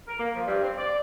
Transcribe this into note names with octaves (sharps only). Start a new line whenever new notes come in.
A#4
A#3
F3
G2
C4
D5